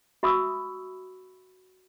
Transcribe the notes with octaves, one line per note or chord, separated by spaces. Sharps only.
F#4 E5 B5 C#6 D#6 E6